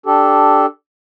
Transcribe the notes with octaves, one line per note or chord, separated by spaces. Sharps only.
D4 G4 A4